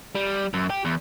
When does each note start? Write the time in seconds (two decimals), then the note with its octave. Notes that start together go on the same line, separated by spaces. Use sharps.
0.15 G3
0.54 F#2
0.70 G4
0.85 E2